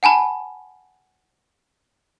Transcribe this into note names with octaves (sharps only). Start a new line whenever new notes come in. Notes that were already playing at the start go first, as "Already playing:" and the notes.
F#5 G#5 A5 B5